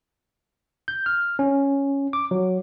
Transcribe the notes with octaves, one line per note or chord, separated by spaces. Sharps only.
G6
F6
C#4
D6
F#3